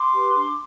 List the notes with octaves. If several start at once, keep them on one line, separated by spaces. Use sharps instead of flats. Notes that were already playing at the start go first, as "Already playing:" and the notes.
Already playing: C6 D6
G4 B4
D4